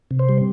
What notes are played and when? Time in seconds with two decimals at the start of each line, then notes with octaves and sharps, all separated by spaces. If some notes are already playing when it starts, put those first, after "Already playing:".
0.11 C3
0.19 C5
0.29 G3